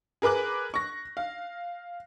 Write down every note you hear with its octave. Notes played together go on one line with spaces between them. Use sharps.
G#4 A#4 B4 D6 F#6
C#6 A#6
F5